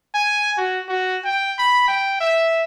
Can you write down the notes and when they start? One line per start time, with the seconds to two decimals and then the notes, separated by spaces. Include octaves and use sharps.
0.14 G#5
0.57 F#4
0.88 F#4
1.24 G5
1.58 B5
1.88 G5
2.20 E5